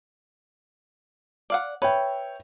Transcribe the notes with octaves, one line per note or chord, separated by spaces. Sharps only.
D5 F5 F#5
B4 C#5 E5 G5